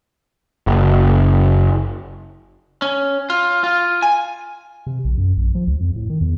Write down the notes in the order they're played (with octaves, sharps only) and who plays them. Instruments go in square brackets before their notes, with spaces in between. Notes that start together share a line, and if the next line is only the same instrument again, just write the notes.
[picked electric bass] F#1
[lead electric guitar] C#4
F4
F4
G#5
[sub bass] C3
A#1
F#2
A#1
F3
C#2
F2
A2
D#3
E2